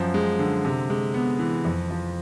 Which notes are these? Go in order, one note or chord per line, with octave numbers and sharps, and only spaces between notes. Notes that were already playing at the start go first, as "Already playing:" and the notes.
Already playing: F#2 F3
G#3
D3
C3
G#3
B3
E3
F2
F3